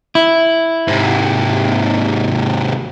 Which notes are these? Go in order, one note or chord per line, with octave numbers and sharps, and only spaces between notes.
E4
G#2 C3